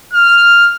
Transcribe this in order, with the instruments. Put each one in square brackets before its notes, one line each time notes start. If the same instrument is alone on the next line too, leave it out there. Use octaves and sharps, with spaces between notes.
[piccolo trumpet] F6